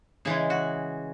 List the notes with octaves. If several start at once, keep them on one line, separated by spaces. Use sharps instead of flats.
C#3 E3 G#3 G#4
F#4